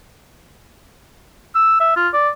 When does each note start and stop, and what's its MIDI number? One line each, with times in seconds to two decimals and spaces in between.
1.55 1.79 88
1.80 1.94 76
1.96 2.09 65
2.14 2.29 74